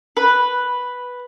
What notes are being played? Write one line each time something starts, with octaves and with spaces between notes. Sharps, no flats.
B4